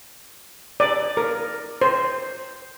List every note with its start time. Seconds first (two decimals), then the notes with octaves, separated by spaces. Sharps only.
0.80 D5
1.17 A#4
1.82 C5